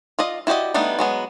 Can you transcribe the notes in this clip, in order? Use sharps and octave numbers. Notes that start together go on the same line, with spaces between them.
F4 D5 D#5
E4 F#4 G4 D5 D#5
G3 A3 B3 D4 D#4
F#3 G#3 B3